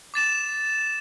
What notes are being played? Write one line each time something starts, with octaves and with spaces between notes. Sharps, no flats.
D6 A6 E7